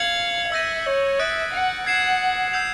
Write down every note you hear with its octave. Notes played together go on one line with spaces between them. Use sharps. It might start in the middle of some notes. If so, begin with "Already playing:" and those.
Already playing: F5 G#6 C#7 F#7
E5 E6 G6 A#6 D#7
C#5
E5 D#6 F#6 A6 D7
F#5
F#5 G#6 C7 E7
E6 G6 C7 F7